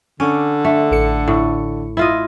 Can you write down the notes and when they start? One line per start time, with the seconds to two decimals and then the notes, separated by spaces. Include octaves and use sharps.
0.20 D3 C#4 D6
0.65 A3 D4
0.91 A1 A4 C#7
1.28 A2
1.97 E4 F4 D#5